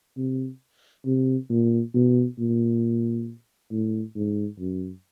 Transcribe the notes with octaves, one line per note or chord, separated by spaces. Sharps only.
C3
C3
A#2
B2
A#2
A2
G#2
F#2